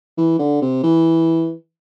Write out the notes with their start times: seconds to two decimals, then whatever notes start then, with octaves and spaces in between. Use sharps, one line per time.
0.17 E3
0.39 D3
0.61 C3
0.83 E3